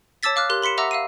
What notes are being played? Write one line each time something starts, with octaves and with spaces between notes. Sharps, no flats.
C#5 A5 D6 E6 A6 B6
F5 D6 F6 F#6
G4 A#4 C6 F#6
B5 C6 B6 C#7 E7
E5 F#5 A#5 D6 E6 A#6
F5 E6 C7 D#7